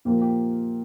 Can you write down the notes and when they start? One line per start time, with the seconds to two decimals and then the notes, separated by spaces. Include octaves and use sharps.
0.05 A#2 F3 A#3 G4
0.21 G4